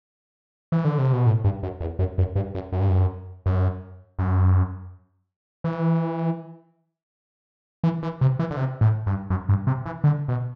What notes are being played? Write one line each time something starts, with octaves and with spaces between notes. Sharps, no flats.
E3
D3
C3
B2
A2
G2
F#2
E2
F#2
F#2
G2
F#2
F#2
G2
F#2
F#2
F#2
E3
E3
E3
C3
E3
D3
C3
A2
G2
F#2
G2
C3
E3
D3
B2